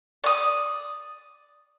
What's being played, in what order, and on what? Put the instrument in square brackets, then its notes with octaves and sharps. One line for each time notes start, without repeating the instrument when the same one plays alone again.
[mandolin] D5 D#6